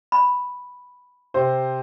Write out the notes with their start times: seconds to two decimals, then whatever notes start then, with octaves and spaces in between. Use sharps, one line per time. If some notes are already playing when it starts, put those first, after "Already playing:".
0.12 B5
1.34 C3 C5